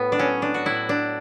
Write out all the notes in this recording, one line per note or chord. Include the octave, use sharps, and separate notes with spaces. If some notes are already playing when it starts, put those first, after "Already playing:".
Already playing: A2 B3
D4
F#3 C#4
D4
F#4
A2 E4
D4